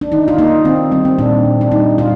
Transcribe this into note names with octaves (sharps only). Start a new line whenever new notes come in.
D4
D#3 D#4
F4
A#3 D#4
D#3 C4
G3 C4
C4
A#2 D4
A#2
D4
G3 D#4
A#2 F4